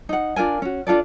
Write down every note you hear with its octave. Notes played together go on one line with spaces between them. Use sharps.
D#4 F#5
D4 F4 A#4 G#5
C#4 F#4
D4 F4 A4 D5